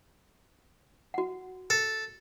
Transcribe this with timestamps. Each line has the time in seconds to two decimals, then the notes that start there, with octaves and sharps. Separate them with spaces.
1.14 F#4 F#5
1.70 A4